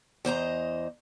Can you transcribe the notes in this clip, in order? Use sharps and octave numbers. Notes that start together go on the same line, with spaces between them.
E2 C5 D#5 A#5